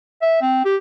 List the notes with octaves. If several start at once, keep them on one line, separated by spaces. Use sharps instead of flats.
E5
C4
G4